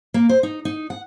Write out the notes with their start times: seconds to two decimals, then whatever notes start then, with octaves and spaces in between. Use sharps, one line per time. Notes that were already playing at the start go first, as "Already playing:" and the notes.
0.14 A#3
0.29 C5
0.43 D#4
0.65 D#4
0.90 F#5